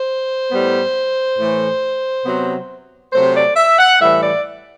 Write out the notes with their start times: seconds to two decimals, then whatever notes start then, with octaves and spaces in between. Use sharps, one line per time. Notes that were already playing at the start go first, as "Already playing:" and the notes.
Already playing: C5
0.50 A2 G3 B3
1.37 A2 E3 A3
2.25 C3 F#3 B3
3.12 C3 F#3 A3 C5
3.34 D5
3.55 E5
3.77 F#5
3.99 A2 E3 G3 E5
4.21 D5